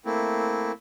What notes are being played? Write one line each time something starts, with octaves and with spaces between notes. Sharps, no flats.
A3 A#3 C4 E4